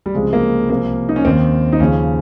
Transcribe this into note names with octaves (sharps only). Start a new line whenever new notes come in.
G3
C#2 C3 F3 G#3
A#3
C2 C3 F3 A#3
D#4
C#4
D#2 D#3 C4
D#4
D#2 C#3 F3 C#4